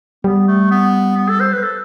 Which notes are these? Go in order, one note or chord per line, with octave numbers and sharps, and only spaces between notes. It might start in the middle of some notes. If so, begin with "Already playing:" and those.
G3 B3
A3
B3
B3
A4
C5
B4
A4